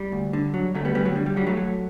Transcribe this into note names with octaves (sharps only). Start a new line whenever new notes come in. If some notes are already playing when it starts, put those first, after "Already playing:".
Already playing: G3
D2
D3
F#3
D2 F#3 A3
G3 B3
D2 G3 B3
F#3
D3 G3
G3
F#3 G3
F#3 A3
F#3